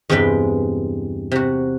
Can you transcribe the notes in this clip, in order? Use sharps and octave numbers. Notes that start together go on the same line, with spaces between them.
E2 G2 C3 G#3 B4 G5
C3 F#4